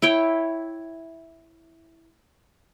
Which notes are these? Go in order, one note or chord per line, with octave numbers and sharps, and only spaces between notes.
E4 C#5 G5